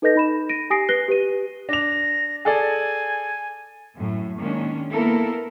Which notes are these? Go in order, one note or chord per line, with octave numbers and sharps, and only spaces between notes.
D#4 A4 B4 D#5 G6 A#6
D#4 B5 E7
A#6 D7 D#7
G4 G#5 D#6 A#6 C7 D7
B4 F#6 A#6 C7 G7
G4 B4 D#7
D4 A#6 F7
G#4 A4 D5 G#5
F#2 A2
D#3 G#3 A#3 C#4 D4
A#3 B3 E4 A4 A#4